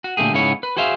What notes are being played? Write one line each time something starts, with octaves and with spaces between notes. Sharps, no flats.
F#4
A#2 D3 A3 G4 G#4
G#2 C#3 B3 E4 C#5
B4
F#4 G#4 C5 E5 F5